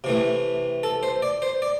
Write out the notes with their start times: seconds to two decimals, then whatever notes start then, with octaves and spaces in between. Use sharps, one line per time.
0.04 C3 E3 A3
0.83 A4
1.03 C5
1.22 D5
1.42 C5
1.62 D5